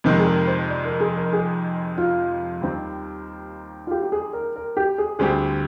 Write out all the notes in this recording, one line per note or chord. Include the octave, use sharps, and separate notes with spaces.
F2 C3 D#3 G#3 A#4
G#4
A#4
C5
D5
A#4
G#4
A#4
G#4
F4
D#2 D#3 G3 C4
F4
G4
G4
G#4
A#4
A#4
G4
G#4
D2 D3 G3 C4 G4 G#4